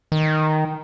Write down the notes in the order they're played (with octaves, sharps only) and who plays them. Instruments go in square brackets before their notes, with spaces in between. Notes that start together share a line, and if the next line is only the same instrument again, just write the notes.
[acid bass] D#3